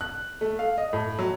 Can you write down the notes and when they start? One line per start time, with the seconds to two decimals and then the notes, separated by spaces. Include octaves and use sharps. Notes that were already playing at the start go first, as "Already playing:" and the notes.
0.01 F#6
0.41 A3
0.59 F5
0.78 D#5
0.93 A2
1.19 F#3